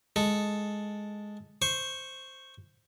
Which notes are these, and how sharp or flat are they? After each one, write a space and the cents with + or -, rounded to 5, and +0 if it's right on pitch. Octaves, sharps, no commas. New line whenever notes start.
G#3 +0 A4 +0
C5 +0 C#6 -10